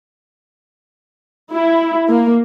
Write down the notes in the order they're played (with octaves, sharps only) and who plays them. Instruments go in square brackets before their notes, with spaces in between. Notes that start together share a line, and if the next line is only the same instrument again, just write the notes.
[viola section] E4
A#3